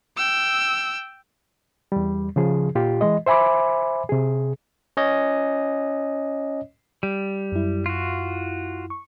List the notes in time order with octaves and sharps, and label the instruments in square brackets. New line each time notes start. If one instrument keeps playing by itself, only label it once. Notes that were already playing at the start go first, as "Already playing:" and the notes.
[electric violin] G5 E6
[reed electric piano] E2 G3
C#3 F3 G#4
A#2 F4 G4
E3 G#3 D#5
C5 E5 G#5 B5 D6
C3 G#4
[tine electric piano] C#4 C#5 D#5
[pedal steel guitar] G3
[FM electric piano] F#2 E4
[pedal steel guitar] F4 F#4
[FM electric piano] C#6